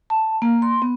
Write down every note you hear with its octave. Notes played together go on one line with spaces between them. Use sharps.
A5
A#3
C6
B3